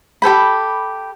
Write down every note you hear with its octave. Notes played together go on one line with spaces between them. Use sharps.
G4 A4 C5 B5